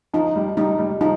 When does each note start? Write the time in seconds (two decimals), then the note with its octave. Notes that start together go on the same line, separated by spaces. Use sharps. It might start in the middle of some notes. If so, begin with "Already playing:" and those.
0.13 F3 D#4
0.36 G3
0.57 G3 D#4
0.79 G3
1.01 F3 D#4